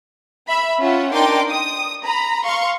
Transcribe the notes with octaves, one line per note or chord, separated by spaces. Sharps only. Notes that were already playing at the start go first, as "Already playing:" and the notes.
E5 B5
C#4 F4 E5 F#5
D4 D#4 A#4 G5 C6 D6
D#6
A#5 B5
F5 C6 C#6